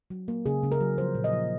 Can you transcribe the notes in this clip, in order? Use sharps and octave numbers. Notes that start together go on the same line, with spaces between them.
F#3
A#3
C#3 G#4
C#3
A#4
F#3
F3 C5
A#2
D#5
F3